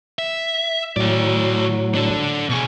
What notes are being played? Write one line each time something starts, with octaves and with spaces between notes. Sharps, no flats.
E5
A2 F#3 F#4 D5
D4 A4
B2 G#4 C#6